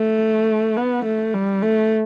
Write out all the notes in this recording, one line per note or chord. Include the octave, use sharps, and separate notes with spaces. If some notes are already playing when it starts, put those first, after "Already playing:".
Already playing: A3
B3
A3
G3
A3